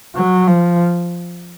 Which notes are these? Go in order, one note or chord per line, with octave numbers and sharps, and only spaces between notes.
F#3
F3